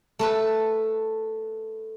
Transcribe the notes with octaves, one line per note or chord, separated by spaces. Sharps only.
A3 A4 B4